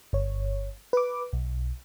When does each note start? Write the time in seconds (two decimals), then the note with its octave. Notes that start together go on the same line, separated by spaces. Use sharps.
0.13 G1 C#5
0.93 B4 D6
1.33 B1